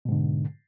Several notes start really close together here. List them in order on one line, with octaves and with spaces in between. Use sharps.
B2 G#2 D3